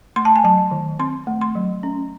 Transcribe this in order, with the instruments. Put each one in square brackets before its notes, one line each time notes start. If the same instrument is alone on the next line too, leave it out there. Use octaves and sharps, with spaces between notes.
[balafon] A3 C6
A5
G#5
F#3 A5
D#3
C4 C6
A3
C6
F#3
C#4